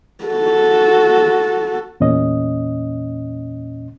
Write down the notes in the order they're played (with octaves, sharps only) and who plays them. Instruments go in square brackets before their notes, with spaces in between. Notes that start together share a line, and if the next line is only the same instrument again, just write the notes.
[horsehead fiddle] F#4 A4
[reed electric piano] E2 A#2 C#4 D#5